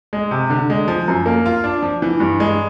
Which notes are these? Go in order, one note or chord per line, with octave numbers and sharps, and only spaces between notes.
G#3
C3
D3
G#3
F3
F#2
A#3
F4
D4
F3
E3
G2
G#3